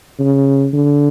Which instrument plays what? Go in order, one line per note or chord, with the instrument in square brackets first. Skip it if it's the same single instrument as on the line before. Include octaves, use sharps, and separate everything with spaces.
[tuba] C#3
D3